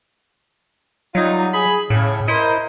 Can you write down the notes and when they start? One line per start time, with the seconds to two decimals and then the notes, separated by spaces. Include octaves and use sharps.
1.15 F#3 G3 D#4 F4
1.54 G#4 B5
1.90 A2 C#3
2.28 E4 A#4 C5 D#5